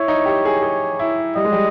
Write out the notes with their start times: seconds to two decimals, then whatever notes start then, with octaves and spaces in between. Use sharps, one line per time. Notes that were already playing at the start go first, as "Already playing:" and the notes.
Already playing: E4 C#5
0.08 D#4
0.26 G4
0.45 G#4
0.62 G#4
0.99 E4
1.36 G3 D#5
1.45 G#3
1.53 G3